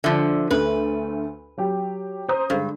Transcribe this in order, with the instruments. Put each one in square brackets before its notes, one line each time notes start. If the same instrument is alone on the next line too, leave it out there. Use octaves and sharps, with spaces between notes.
[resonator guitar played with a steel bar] D3 F3 [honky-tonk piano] D4 E5
[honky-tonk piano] D2 A3 [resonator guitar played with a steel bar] B4
[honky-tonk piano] F#3 G4
C5 A#5 D#6
[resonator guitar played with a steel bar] G2 [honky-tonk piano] D3 G#3